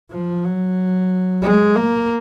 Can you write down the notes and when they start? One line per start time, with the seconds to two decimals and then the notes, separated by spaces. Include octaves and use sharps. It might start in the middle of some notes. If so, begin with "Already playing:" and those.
0.11 F3
0.45 F#3
1.42 G#3
1.75 A#3